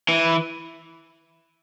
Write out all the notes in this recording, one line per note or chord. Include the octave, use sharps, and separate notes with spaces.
E3